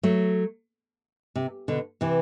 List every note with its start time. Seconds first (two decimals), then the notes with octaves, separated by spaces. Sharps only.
0.03 F#3 A3
1.36 C3
1.68 B2 D3
2.01 C3 E3